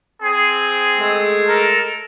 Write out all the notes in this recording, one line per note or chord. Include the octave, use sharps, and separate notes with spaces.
C4 G#4
G#3 A3
A4 A#4